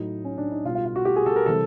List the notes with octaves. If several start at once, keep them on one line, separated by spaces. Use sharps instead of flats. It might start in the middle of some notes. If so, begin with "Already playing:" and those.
Already playing: A2 F#3 D#4
C#4
D4
D#4
B2 G3 F4
F4
F4
F#4
G4
G#4
A4
A#4
C3 E3 G3 A4